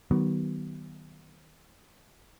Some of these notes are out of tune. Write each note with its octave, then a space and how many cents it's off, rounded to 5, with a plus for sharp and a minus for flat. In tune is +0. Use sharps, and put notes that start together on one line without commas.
D#3 +0 F#3 +40 B3 +0